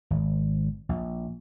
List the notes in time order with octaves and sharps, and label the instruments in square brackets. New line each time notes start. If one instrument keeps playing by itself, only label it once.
[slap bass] G#1
A#1